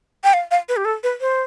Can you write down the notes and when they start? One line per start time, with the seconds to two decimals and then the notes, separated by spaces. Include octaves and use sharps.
0.24 G5
0.33 F5
0.51 F5
0.69 B4
0.77 G4
0.85 A4
1.03 B4
1.21 C5